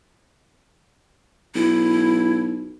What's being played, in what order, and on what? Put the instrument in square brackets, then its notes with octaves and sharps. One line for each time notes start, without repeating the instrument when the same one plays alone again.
[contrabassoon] B1 [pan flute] E4